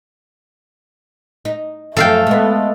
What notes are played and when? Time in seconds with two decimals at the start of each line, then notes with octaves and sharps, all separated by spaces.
1.45 D#4
1.97 F#2 F3 A3 A4 F5 G5
2.27 G#3 B3